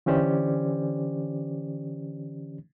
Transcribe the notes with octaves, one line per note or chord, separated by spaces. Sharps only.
D3 E3 C#4 G4 C5 D5